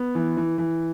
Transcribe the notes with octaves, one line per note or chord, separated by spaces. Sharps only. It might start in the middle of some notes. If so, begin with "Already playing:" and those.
Already playing: B3
E3
E3
E3